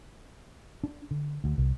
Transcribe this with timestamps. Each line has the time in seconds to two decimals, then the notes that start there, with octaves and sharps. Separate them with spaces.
0.84 D4
1.11 D3
1.44 D2
1.58 C2